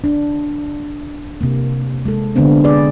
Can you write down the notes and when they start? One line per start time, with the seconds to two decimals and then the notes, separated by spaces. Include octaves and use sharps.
0.04 D4
1.41 C3 A#3
2.05 G#3 A4
2.35 D3 G#3 B3 C4 D4
2.64 G#4 B4 D5